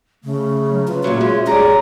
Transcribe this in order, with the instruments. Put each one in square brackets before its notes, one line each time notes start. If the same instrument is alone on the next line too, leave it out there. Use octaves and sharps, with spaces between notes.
[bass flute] C#3 [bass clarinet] A3
[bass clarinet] F#3
[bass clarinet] F4 [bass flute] B4
[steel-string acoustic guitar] A#2 C#3 F#3 [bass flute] E5
[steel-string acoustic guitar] G#3 [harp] C#4
[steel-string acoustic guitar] G3 G#4 [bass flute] C#5 [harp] D5 A#5